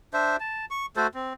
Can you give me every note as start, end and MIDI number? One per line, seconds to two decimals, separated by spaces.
0.14 0.36 62
0.14 0.36 72
0.14 0.36 76
0.40 0.65 81
0.71 0.86 85
0.96 1.07 57
0.96 1.07 66
0.96 1.07 69
0.96 1.07 72
1.14 1.33 60